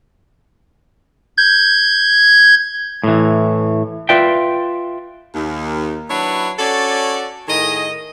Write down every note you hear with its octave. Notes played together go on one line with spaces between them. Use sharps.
G6 G#6
A2 E3
F4 B4 D5 E5 G5
D#2
F#3 D4 E4 B4 C#5
C#4 F#4 A4 D5
A2 D#3 G#4 D#5